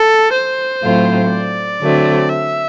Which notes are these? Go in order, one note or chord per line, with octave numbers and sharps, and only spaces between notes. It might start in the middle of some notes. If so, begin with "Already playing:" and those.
Already playing: A4
C5
A2 F#3 A3 C4 F4
D5
D3 F#3 A3 C4
E5